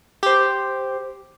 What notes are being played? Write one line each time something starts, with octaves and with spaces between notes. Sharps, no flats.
G4 C5